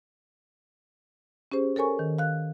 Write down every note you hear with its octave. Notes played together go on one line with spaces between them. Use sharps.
C#4 G4 G#4 C5
A4 A#4 C#5 G#5 C#6
D#3
F5 F#6